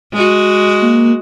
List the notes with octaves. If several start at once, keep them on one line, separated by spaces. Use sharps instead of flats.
G#3 F#4
A#3